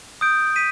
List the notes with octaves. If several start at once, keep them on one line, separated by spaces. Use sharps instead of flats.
D#6 G6 D7
B6 D#7